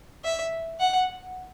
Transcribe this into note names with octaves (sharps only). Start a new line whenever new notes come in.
E5
F#5